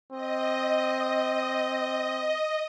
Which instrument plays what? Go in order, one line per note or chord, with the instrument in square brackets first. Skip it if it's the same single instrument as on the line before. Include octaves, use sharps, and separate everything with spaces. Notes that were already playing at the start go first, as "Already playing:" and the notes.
[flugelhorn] C4 [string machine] D#5